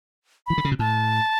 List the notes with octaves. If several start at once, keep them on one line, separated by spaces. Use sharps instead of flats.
E3 B5
D3
C#3
B2
A2 A5